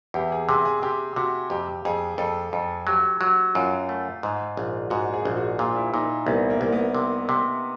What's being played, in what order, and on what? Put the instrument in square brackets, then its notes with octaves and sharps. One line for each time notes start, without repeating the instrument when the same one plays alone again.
[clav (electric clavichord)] E2 [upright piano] G4
[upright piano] G#4
[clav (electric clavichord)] C3 [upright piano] G#4
[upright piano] G#4
[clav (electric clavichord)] C3 [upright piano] G4
[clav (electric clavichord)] C3 [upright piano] F#4
[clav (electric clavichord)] F2 [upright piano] G4
[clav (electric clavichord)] F2 [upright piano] G#4
[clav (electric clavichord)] F2 [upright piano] A4
[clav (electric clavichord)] F2
[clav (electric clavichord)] F#3 [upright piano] G4
[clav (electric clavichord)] F#3 [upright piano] F#4
[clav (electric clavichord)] F#2 [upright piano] F4
[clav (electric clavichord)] A3
G#2
A#1
[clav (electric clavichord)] G#2 [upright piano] F#4
[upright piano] G#4
[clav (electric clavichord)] A#1
[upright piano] F#4
[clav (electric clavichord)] A#2 [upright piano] F4
[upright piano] E4
[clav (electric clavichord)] A#2 [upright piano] D#4
[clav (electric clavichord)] C2 [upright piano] B3
[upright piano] A#3
[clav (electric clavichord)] C2
[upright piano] B3
[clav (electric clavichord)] C3
C3